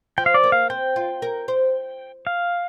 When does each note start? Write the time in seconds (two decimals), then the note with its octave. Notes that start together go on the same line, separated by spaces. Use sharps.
0.18 F3 G5
0.26 F5
0.34 D5
0.44 A#3
0.52 F5
0.70 C4 G5
0.96 F4
1.22 A#4
1.48 C5
2.27 F5